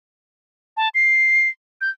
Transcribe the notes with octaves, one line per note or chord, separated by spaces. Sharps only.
A5
C7
G6